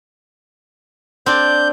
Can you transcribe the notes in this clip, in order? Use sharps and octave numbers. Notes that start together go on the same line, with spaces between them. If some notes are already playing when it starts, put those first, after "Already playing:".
C4 D4 D5 G6